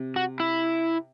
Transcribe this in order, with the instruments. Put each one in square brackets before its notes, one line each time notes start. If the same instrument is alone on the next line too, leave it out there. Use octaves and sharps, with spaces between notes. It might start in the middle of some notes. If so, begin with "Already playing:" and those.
Already playing: [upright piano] C3
[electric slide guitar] F#4
E4